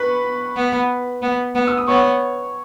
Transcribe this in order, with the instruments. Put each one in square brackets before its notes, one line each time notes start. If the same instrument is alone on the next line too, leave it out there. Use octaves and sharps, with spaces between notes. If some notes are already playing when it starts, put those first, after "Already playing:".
Already playing: [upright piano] B4 B5 C#6
[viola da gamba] B3
B3
B3
[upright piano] E6
D#6
[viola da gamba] B3 [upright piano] C#5 C#6